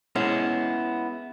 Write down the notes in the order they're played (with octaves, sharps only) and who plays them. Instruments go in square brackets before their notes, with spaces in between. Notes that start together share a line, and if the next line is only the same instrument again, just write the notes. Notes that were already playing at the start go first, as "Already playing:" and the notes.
[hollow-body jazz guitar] G#3 B3 C#4 E4